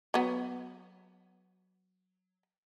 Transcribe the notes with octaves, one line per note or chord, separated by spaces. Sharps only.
F#3 B3